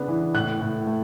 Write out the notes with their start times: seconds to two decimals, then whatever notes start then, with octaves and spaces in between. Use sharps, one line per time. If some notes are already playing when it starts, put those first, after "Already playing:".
Already playing: C#3 B3 D4
0.08 E3
0.34 A2 F#6
0.61 A2
0.87 A3